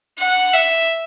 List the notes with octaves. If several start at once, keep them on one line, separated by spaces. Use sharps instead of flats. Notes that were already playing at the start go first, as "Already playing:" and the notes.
F#5
E5